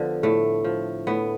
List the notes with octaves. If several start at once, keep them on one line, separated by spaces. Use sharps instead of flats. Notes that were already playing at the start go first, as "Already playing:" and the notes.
Already playing: D3 F3 B3
A2 A3
F3
A2 B3